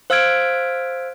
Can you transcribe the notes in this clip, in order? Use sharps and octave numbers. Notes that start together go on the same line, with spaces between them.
C5 F5 E6 F6 G#6 D7